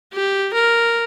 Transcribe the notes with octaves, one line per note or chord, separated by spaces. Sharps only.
G4
A#4